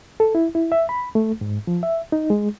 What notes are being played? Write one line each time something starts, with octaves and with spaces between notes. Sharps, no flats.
A4
E4
E4
E5
B5
A3
G#2
F3
E5
D#4
G#3